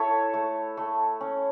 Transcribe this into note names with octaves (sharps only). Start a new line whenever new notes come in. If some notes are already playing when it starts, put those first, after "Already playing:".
Already playing: E4 A4 C#5
A3
A3
C#4